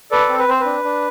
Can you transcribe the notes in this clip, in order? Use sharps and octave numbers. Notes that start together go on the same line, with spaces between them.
A4 B4 D5
C4
B4
C4 C5
D4 B4
D4